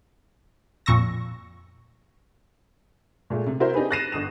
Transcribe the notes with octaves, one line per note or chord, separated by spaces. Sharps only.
F2 A#2 C#6 E6 A#6
A#2 G#3 A3
C3
E4 F#4 A#4 C5
C4 D4 D#4 G4 G#4 B4
F#6 A6 A#6 C7 D#7 E7
G1 D#6 E7